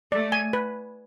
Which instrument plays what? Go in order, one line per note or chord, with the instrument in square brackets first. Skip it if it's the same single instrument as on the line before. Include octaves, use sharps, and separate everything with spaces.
[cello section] A3 [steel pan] D5
[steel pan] G#5
B4